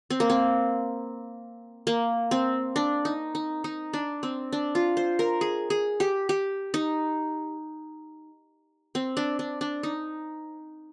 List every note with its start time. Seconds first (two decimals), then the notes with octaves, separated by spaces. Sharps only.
0.10 C4
0.20 A#3
0.30 C4
1.87 A#3
2.31 C4
2.76 D4
3.05 D#4
3.35 D#4
3.64 D#4
3.93 D4
4.23 C4
4.53 D4
4.75 F4
4.97 C5
5.19 A#4
5.41 G#4
5.70 G#4
6.00 G4
6.29 G4
6.74 D#4
8.95 C4
9.17 D4
9.39 D4
9.61 D4
9.83 D#4